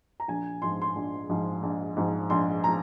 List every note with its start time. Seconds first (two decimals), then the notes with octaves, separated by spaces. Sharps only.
0.20 A#5
0.28 A#1 G#5
0.62 G#2 F3 C6
0.82 C6
0.96 A#1
1.29 G#2 F3
1.63 A#1
1.97 G#2 F3
2.30 A#1 C6
2.64 F3 A#5